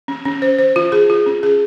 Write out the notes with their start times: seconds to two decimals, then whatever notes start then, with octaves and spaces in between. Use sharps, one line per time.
0.08 C#4
0.25 C#4
0.42 C5
0.59 C5
0.76 F4
0.92 G#4
1.10 F4
1.26 C#4
1.43 G#4